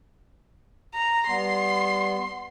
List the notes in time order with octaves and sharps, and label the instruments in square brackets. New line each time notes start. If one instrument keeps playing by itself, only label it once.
[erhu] A#5
[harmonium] G3 B3 [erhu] C6